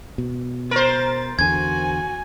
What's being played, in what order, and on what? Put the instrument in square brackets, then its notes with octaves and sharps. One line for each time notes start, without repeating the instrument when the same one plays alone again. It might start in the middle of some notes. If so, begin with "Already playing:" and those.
[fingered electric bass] B2
[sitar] A#4 C5 [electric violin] A6
[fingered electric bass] E2 D3 [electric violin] F#4 G#5 [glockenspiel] G#6